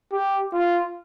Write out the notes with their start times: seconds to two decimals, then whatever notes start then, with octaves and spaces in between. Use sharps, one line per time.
0.12 G4
0.53 F4